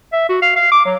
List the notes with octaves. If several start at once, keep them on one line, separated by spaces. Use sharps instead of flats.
E5
F#4
F5
F5
D6
F#3